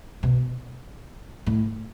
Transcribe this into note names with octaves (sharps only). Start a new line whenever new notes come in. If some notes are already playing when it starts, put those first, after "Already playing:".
B2
A2